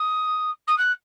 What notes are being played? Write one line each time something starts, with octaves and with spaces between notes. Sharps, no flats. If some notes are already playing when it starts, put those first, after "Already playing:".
Already playing: D#6
D#6
F#6